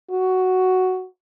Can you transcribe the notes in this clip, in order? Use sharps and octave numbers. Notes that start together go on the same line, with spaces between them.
F#4